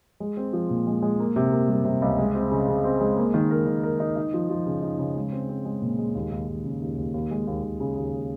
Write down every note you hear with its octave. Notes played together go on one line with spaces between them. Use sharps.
G#3
C4
F3
A#2
G#3
G#3
A#3
C3
A#3
G3
C3
C#2
G#3
C4
C#3
C#3
C4
G#3
A#3
D#3
A#4
D#3
A#4
D#4
D#4
F3
F3
C#3
D#4
C#3
G#3
C4
C4
G#3
A#2
G#3
D#2
D#2
D#2
C#3
D#2
D#2
D#2
G#3
D#2
D#2
C#3
D#2